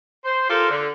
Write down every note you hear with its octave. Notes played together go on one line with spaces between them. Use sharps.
C5
F4 G4 A4 A#4 C5
D3